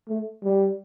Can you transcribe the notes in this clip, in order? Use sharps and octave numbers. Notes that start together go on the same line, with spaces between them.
A3
G3